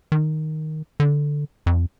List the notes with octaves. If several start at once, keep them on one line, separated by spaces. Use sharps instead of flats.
D#3
D3
F2